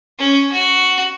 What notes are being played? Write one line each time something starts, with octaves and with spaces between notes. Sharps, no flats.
C#4
F#4